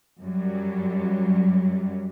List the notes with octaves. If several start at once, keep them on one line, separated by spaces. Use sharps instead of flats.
F#2 F#3 G3